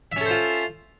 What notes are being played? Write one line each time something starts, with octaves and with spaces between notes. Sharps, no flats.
C#4 F4 A4 C5 E5